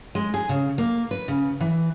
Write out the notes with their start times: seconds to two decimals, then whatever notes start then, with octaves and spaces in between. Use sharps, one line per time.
0.15 G#3
0.34 G#4
0.49 C#3
0.78 A#3
1.11 B4
1.28 C#3
1.61 E3